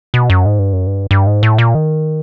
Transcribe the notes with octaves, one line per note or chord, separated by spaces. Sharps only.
B2
F#2
G#2
G2
F#2
G2
G2
G#2
A2
A#2
D#3